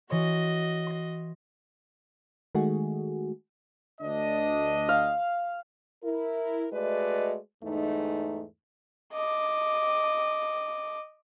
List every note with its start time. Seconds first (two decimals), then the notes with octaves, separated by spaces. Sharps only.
0.10 E3 F#4 C#5 D#5 C6
0.87 C6 A#6
2.55 D#3 G#3 A3 F#4 G#4
4.01 D2 D4 D#5
4.89 F5
6.04 E4 A#4
6.72 G#3 A3 F#4 B4 D5 D#5
7.63 E2 G#2 A3 D#4
9.13 D#5 D6